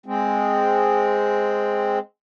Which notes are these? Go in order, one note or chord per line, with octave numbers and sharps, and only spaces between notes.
G#3 C4